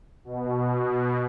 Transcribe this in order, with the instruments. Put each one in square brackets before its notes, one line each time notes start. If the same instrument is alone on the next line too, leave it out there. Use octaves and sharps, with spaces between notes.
[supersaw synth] B2